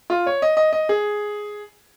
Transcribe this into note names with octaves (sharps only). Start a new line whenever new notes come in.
F4
C#5
D#5
D#5
D#5
G#4